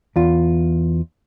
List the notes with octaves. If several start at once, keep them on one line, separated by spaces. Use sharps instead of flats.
E2 F4